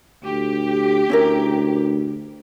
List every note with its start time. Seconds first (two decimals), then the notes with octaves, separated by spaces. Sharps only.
0.24 D2 G4
1.10 D2 C#4 E4 A#4